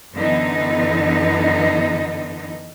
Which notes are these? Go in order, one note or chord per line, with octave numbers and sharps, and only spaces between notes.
F#2 D3 E3 B3 D#4